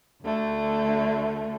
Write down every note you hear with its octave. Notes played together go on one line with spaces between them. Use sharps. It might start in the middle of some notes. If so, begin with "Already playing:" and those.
D2 D3 A3